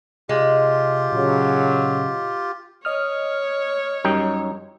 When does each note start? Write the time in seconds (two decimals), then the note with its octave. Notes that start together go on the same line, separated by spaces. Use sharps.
0.29 C3 G#3 F4 G4
1.12 A#2 C#3 F#3
2.85 C#5 D#5 D#6 F6
4.05 F#2 G3 D#4 G5